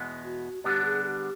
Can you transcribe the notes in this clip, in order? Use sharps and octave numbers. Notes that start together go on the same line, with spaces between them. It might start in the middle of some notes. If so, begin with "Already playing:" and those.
Already playing: E2 B2 G#3 B3
F#4
D3 G3 B3 D4 G4
G#4
G#4
G4